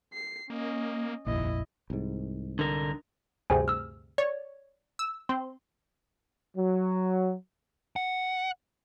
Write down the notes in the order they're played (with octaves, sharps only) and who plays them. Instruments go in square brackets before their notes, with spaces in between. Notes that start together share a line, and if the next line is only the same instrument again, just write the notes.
[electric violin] C7
[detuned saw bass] A#3 [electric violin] C#4 D#5
[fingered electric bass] F1 A#1 [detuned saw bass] D#2 [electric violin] E4 D#5
[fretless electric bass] C2 G#2
[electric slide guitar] D3 A#4
[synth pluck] D2 G2 C3 [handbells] G#4 C5 G#5
[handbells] E6 F6
[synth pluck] C#5 [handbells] D5
[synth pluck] E6
[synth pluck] C4 [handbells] C6
[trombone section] F#3
[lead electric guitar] F#5